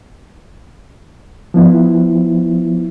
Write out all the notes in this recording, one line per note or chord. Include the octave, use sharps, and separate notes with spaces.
F3 B3 E4